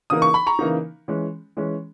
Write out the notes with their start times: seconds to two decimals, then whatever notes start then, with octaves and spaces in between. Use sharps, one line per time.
0.10 C#3 E3 A#3 D#4 D#6
0.22 C#6
0.34 B5
0.47 A#5 C#6
0.59 C#3 E3 A#3 D#4
1.08 E3 G#3 C#4
1.57 E3 G#3 C#4